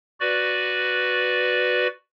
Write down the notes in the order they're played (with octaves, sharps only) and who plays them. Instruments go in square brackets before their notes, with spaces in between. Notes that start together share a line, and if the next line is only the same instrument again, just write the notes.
[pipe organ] F#4 B4 D5